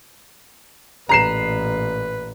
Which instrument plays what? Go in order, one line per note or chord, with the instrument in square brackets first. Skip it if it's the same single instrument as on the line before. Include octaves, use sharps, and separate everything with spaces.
[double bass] A1 A#2 [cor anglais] B4 [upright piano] A#5 C7 E7